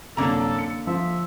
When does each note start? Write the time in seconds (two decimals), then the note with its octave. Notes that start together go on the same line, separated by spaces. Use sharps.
0.17 C2 F#2 D3 A#3 A4 A#5
0.58 C#7
0.87 F3 E5